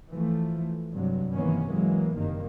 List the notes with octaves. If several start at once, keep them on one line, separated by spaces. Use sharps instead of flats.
E3 F3 A3
G2 C3 F#3
C3 D#3 E3 A#3 B3 C#4
E3 F#3 G#3 A#3
F#1 G2 C3 D#3 A#3